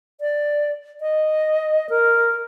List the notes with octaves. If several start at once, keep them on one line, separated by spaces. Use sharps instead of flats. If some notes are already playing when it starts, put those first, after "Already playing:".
D5
D#5
A#4